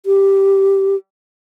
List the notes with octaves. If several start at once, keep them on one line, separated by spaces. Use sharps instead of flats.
G4